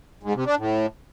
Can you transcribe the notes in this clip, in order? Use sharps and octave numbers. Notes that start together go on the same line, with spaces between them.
G#2
C3
D4
A2